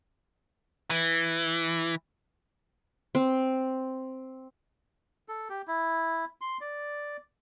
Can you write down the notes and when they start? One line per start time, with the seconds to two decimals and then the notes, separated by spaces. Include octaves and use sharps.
0.90 E3
3.15 C4
5.29 A4
5.49 G4
5.68 E4
6.41 C6
6.61 D5